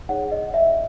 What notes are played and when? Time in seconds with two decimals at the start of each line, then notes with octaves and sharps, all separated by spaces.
0.09 D#4 G#4 C#5 F#5
0.32 D#5
0.54 E5